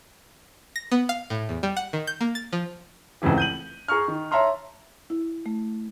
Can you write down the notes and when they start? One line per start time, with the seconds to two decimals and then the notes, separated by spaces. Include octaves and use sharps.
0.76 A#6
0.91 B3
1.09 F5
1.30 A2
1.49 E2
1.63 G3
1.77 F#5
1.93 D#3
2.07 G6
2.21 A#3
2.35 A6
2.53 F3
3.22 F1 C#2 C#3 E3 G4
3.38 G6 D#7 F#7
3.88 G#4 A#5 C#6 F6
4.08 D#3
4.31 C#5 E5 A5 A#5 C6 F6
5.10 E4
5.46 A3